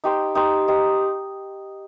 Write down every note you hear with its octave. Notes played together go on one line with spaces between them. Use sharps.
D#4 G4 C5
D#4 G4 C5
D#4 G4 C5